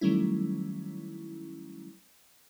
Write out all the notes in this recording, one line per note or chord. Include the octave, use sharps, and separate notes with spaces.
D#3 F#3 G3 A3 C#4 E4